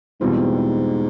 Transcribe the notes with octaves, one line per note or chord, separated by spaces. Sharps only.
E2 G#2 B2 G3 C4 F4